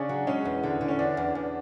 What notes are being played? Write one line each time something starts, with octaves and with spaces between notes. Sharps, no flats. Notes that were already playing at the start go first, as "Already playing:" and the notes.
Already playing: C#3 C#4 D4 G#4
F#3
G#3 C#4
E2
D3
D3
C#4
E2 D4
E2
E2